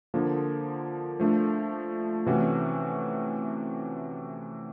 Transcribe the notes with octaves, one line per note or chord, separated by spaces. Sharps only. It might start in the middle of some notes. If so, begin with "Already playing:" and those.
D3 F3 A#3
F3 A3 D4
C3 E3 A3 C#4 F#4